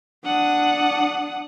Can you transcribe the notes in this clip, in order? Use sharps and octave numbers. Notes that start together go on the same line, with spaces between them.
D4 F#5 D#6